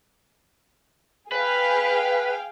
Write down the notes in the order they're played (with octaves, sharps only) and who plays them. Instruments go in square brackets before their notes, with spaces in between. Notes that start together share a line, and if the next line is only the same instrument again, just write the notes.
[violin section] G#4 F5 G5 [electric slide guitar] B4